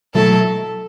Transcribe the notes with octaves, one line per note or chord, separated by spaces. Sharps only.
B2 F#3 A3 E4 A4